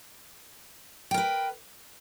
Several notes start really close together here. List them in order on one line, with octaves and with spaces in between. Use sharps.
G5 A#4 B4